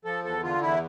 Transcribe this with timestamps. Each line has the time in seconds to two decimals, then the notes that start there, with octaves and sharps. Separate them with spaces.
0.05 F3 A4
0.24 E2 A4
0.43 D3 F4
0.61 E2 E4